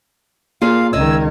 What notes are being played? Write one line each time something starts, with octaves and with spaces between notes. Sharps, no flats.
A#3 F4 G#4 D5 F5
C#2 D#3 D5 D#5 E6 G#6